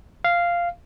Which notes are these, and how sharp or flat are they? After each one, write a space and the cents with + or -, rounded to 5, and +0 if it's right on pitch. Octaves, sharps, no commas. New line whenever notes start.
F5 -5